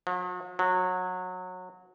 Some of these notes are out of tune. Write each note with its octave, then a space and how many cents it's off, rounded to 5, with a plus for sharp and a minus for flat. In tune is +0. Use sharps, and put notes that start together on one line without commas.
F#3 -45
F#3 -20